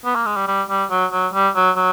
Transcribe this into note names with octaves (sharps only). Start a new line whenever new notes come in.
B3
A#3
G#3
G3
G3
G3
F#3
F#3
G3
F#3
F#3